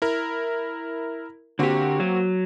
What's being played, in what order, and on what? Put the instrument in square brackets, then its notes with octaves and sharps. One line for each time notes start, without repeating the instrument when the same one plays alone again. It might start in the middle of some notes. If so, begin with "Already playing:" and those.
[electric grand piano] E4 A#4
[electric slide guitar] D3 G4 [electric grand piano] A#3 C4 F#4
[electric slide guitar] F#3